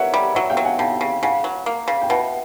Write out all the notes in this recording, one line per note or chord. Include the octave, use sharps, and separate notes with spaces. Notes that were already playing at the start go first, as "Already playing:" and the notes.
Already playing: A#4 B4 C#5 E5 F#5
G3
F#3 E5 F#5
F5 G5
F#3
F#5 G#5
C#3 G5 A5
C#3
C#3 F#5 G#5
F#3
A#3
C#3
G5
B2 E5 F#5